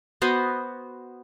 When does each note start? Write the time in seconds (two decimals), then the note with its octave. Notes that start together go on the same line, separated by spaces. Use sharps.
0.22 B3 F#4 C5 D#5